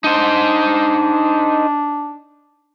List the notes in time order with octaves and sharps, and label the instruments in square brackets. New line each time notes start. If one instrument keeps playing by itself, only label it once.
[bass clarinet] D4 [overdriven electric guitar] D#4 C5